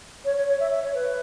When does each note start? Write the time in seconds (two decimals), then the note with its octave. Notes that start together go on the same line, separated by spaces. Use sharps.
0.25 C#5
0.37 C#5
0.48 C#5
0.60 E5
0.71 E5
0.82 C#5
0.95 B4